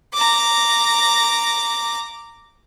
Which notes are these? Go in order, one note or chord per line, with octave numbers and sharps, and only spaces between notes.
A#5 D6